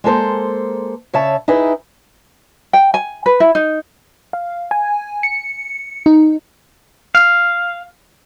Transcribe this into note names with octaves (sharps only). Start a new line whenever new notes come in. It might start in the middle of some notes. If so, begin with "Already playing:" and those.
G#3 A#3 A4 C5
C#3 C#5 E5 A5
D#4 E4 G#4 B4
G5
G#5
B4
E4
D#4
F5
G#5
C#7
D#4
F5